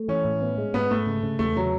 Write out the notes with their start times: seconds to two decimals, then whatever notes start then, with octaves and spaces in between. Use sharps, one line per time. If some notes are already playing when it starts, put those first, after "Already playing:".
Already playing: A3
0.08 E3 C#4
0.25 A2
0.42 B3
0.58 G#3
0.74 G#2 B3
0.91 G#2 A3
1.07 C#3
1.23 C#3
1.39 E2 A3
1.56 C#3 F#3